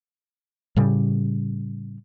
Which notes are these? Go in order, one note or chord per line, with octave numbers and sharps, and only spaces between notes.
A2 C#3 G3